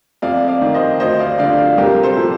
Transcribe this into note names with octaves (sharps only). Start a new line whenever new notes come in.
F2 D5 F5
D5 F5
D#3
C5 D#5
D2 C5 D#5
D5 F5
D3 F3 D5 F5
D5 F5
C2 G4 A#4
A4 C5
A#2 F3